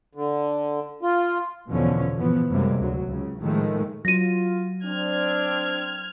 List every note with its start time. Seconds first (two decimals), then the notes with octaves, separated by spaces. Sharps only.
0.15 D3
1.02 F4
1.69 E2 B2 D3 F3 C#4
2.14 G2 A#2 E3 F3 B3
2.50 F#2 C3 G3 G#3 A#3
2.80 D2 F#3
3.09 C#2 C#3
3.39 A2 D#3 F3 G#3 A3
4.05 F#3 F4 A#6 D#7
4.85 C4 D4 F6 G#6